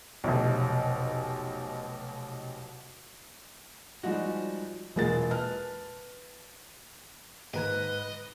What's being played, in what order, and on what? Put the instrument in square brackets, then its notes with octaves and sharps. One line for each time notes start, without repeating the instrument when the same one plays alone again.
[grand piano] F1 B1
[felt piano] F3 G3 G#3 D#4 F#4
E1 A#2 G#3 A#3 G#4 A6
B4 A5 F6
[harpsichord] A#1 A#4 G#5 [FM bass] G#2 [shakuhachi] B4 [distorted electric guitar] D#5